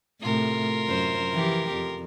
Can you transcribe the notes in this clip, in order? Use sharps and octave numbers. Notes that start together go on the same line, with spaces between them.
A2 C3 A3 F4 A#4
F#2 C5
E3 F3 G4
F2